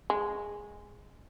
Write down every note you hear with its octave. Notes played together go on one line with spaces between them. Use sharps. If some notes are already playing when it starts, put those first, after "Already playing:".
G#3